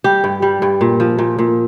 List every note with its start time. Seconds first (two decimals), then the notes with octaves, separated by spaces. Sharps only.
0.04 G3 G4
0.24 G2
0.42 G3
0.62 G2
0.81 A#2
1.00 F3
1.19 A#2
1.38 A#2